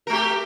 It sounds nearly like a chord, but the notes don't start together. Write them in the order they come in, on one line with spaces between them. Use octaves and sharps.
A#4 A3 G4